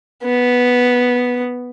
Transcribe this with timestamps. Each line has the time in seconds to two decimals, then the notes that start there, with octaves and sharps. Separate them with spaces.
0.25 B3